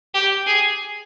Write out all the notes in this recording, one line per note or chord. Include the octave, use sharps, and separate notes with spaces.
G4
G#4